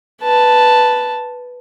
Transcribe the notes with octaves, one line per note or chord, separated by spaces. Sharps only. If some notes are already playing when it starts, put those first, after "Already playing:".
B4 A5